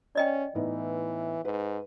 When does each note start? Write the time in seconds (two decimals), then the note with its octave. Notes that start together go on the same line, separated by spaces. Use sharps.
0.15 C#4 D5 D#5 G5
0.55 A2 E3 B3 D#4
1.45 G#2 B4